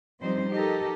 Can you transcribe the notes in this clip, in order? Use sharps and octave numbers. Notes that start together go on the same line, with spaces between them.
F3 G3 C4 D#4 C5
D#4 G4 A4 A#4